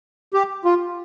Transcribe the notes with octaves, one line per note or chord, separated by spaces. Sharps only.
G4
F4